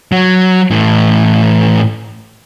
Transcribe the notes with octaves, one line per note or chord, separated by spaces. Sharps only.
F#3
A2 E3